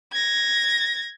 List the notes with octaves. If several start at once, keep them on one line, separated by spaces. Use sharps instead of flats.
G#6 A#6